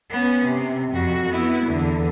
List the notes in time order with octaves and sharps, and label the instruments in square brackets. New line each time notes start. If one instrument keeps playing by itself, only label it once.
[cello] B3 C#4
C3
F2 F#4
B3 E4
E2 D3